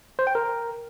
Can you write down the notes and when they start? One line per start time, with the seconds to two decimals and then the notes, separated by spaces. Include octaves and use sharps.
0.19 C5
0.27 G5
0.35 A#4